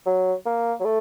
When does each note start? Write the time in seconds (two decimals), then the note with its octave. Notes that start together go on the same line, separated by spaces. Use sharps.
0.06 F#3
0.46 A#3
0.80 F#3
0.85 A3